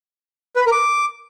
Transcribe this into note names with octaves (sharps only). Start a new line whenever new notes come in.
B4
B5
A#4
D6